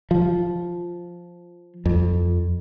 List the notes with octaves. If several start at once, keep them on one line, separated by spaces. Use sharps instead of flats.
F3
F2